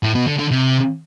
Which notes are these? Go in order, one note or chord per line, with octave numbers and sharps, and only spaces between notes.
A2
B2
D3
D3
C3